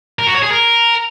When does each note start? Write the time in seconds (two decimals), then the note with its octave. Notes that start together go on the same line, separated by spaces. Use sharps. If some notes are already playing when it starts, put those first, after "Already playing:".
0.19 A#4
0.27 F#4
0.35 C#5
0.42 G#4
0.50 A#4